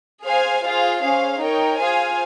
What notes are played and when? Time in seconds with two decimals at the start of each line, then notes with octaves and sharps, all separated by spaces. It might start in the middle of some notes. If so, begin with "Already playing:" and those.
0.24 G#4 C5 F5 G#5
0.63 F4 G#4 C5 F5
1.01 C#4 G#4 C5 F5
1.40 D#4 A#4 C#5 G5
1.79 F4 G#4 C5 F5 G#5